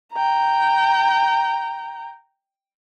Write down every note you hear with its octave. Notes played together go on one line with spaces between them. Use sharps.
G5 A#5